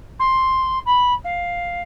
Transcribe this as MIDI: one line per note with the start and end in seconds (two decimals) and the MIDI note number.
0.19 0.79 84
0.85 1.13 83
1.24 1.81 77